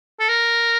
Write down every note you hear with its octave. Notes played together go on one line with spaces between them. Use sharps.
A4
A#4